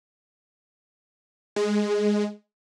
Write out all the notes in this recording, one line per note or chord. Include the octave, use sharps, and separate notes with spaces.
G#3